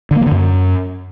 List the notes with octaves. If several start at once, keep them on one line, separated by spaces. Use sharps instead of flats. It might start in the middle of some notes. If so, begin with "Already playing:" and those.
D3
A#3
E3
D3
F#2